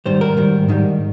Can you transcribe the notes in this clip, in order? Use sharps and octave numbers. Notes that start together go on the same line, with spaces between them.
G#2 D#3 G3 C5
A#4
G#2 D#3 G3
G#2 D#3 G3